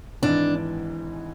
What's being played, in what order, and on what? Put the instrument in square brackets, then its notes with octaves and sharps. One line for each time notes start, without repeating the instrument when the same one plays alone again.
[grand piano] G#1 G#2 E3 [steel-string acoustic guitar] D4